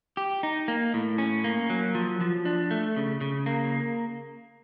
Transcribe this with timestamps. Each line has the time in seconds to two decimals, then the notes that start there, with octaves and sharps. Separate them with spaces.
0.17 G4
0.43 D#4
0.68 A#3
0.94 A2
1.18 C#4
1.44 A#3
1.70 F#3
1.95 F3
2.21 F3
2.45 D4
2.71 A3
2.97 C#3
3.21 C#3
3.46 A#3